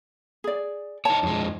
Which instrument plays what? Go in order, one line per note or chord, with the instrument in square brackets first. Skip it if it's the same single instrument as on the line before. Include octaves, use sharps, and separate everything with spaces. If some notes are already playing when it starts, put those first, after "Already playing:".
[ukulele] G#4 D5
[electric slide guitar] D#4 C#5 [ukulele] A5
[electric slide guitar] F2 G#3